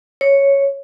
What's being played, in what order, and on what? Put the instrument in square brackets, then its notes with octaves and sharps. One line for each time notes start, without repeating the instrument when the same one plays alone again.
[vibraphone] C#5